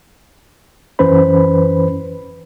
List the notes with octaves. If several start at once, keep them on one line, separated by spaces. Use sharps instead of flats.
F#2 E3 C#4 B4 C5 B5